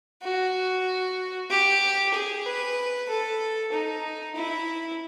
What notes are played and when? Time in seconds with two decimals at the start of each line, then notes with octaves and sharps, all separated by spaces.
0.22 F#4
1.50 G4
2.14 G#4
2.46 B4
3.09 A4
3.72 D#4
4.35 E4